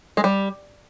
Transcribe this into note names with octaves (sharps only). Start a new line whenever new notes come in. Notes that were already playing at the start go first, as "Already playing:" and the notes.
G#3
G3